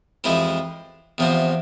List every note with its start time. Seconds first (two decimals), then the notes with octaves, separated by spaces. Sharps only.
0.24 F2 E3 G#3 E4 G4
1.18 E2 C3 F3 C4